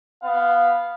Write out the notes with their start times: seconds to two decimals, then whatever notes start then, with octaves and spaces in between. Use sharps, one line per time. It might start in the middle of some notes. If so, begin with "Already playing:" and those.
0.22 B3 F5